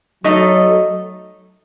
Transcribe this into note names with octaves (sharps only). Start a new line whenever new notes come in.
F#3 A3 D#4 A4 D#5